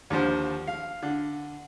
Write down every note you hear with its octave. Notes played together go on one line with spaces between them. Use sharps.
D#2 D3 F3 C5
F5
D3